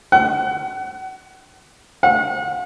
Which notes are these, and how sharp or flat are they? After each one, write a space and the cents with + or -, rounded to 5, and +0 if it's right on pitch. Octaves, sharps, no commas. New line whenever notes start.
F#5 +30
F#5 -40